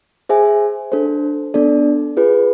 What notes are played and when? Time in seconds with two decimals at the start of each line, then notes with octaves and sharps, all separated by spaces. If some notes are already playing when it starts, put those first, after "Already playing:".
0.29 G#4 C5 E5 G#5
0.92 D4 A4 C5
1.54 B3 D4 A4 D5
2.17 F4 G#4 B4